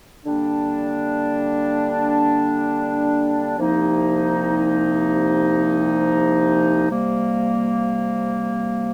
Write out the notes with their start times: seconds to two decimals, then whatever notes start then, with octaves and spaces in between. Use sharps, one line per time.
0.25 D3 G3 A#3 D4
3.57 C2 C3 F3 A#3 D#4
6.90 C3 G3 A#3